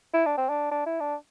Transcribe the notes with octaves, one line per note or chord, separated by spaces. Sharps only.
E4
D4
C4
D4
D4
E4
D4